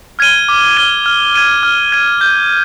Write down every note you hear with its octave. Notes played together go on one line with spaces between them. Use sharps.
F6 G#6 D#7 G7
D6
F6 G#6 D#7 G7
F6
G#6 D#7
F6
G#6 D#7
G6